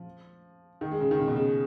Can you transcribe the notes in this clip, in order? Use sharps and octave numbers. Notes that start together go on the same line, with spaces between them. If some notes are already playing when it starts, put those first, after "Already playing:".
Already playing: F3
D#3
G#3
C#3
D#3
C#3
B2
C#3